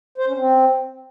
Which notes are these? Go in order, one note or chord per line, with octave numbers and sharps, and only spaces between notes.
C5
C#4
C4